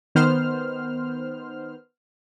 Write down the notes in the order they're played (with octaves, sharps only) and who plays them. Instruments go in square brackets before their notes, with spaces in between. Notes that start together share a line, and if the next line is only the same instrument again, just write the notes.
[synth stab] D#3 B3 C5 F6